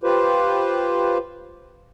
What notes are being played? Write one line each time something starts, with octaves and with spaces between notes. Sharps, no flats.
F4 G4 B4 C5